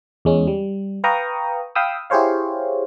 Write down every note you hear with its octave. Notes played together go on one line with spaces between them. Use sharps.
E2 G#3 C#4
G3
B4 F5 G5 A#5 C#6 D#6
F5 G5 B5 D#6 E6
E4 G4 G#4 C5 C#5 F5